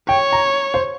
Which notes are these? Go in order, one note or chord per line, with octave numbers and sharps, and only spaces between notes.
C#5 G5
A#5
C5